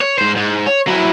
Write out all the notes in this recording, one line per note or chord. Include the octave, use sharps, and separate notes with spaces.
C#5
G#2 C5
G#2
C#5
F#3 E4